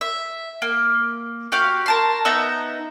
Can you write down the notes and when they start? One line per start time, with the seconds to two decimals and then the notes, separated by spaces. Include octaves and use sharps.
0.01 E5
0.62 A#3
1.52 F#4 G4 F5
1.86 A#4 A5 C6
2.25 B3 D#4 E5 A#5